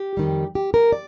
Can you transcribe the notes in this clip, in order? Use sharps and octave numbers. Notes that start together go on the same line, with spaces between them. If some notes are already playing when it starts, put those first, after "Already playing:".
Already playing: G4
F2 D#3 G3
G4
A#4
D5